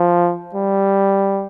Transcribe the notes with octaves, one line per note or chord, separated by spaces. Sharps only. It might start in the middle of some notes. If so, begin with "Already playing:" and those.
Already playing: F3
G3